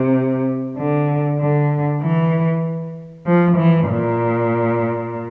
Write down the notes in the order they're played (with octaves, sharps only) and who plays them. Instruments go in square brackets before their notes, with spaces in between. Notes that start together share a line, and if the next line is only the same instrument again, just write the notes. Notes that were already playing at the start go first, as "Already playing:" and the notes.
Already playing: [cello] C3
D3
D3
E3
F3
E3
A#2